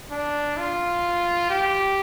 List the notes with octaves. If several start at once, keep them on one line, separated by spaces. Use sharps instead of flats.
D4
F4
G4